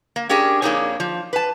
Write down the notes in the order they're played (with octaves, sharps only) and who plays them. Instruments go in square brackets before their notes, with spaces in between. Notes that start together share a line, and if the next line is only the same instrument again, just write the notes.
[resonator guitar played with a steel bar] A#3
C#4 D4 G4 G#4 A#4
F2 A#3 D4 D#4 G#4 C#5
F3
B4 A5